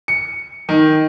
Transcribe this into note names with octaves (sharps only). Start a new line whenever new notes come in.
C#7
D#3